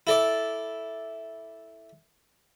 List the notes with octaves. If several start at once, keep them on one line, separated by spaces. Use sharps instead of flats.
E4 A4 D5